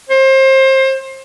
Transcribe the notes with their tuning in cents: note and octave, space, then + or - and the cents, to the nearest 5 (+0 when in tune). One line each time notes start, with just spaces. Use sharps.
C5 +30